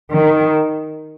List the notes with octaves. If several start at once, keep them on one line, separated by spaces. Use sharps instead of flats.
D#3